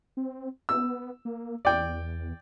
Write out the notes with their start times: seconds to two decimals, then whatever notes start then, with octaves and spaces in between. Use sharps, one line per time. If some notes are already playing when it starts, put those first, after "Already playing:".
0.17 C4
0.69 B3 E6
1.25 A#3
1.65 E2 D5 G5